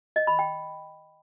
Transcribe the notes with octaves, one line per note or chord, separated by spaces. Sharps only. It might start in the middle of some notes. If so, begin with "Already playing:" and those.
D#5
B5
G5